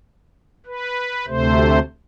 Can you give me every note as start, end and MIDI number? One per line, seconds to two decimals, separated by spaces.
0.66 1.26 71
1.27 1.79 38
1.27 1.79 48
1.27 1.79 57
1.27 1.79 72